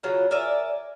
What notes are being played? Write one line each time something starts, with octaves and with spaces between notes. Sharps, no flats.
C#3 F#3 F4 F#5
A#4 D5 E5 G#5